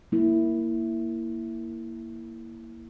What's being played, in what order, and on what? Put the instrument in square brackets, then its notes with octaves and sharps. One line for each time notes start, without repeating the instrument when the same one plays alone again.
[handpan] A#3 E4